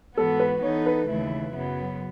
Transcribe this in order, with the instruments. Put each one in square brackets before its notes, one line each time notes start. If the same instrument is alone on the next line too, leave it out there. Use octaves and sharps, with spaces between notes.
[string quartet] G#2 E3 B3 F#4 [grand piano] A4
[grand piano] B4
[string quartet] E3 B3 D#4 A4 [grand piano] C#5
[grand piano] B4
[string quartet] D#2 C#3 E3 A3 E4
F#2 C#3 F#3 B3